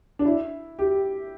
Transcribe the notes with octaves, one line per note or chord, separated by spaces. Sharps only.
D4
E4
G4